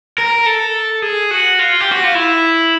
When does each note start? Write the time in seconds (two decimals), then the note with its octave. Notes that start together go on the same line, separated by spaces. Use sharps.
0.18 A#4
0.46 A4
1.02 G#4
1.31 F#4
1.59 F4
1.81 G4
1.92 F#4
2.04 F4
2.15 E4